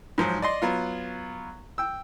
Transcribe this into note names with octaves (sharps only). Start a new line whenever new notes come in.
G#2 F3 F#3
D5 D#5 C6
F#3 B3 F4
G5 E6